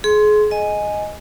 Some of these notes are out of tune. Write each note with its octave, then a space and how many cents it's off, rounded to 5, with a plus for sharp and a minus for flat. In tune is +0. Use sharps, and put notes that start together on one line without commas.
G#4 +30 C6 +0
D#5 +0 G#5 +0